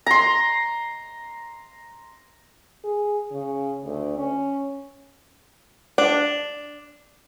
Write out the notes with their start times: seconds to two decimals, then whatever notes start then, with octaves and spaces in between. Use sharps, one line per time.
0.06 A#5 C6
2.84 G#4
3.31 C#3
3.84 D2
4.18 C#4
5.98 D4